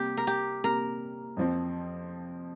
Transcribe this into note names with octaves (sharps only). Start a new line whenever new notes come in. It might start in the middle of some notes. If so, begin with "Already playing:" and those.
Already playing: C3 G3 A#3 G4
A#4
G4
C3 G3 A#3 A#4
F2 F3 C4